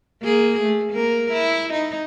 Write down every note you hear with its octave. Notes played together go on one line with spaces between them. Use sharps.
A#3 G#4
A3
A#3 A#4
E4
D#4